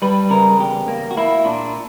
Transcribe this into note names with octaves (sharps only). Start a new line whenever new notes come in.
G3 B4
C#3 A#4
E2 G4
A#3
F#4
A#3 E4
A#2 D4